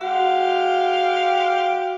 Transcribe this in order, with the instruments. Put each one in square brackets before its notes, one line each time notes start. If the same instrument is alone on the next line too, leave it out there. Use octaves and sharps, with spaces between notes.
[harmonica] G#3 G4 F5 [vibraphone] F#4 F#5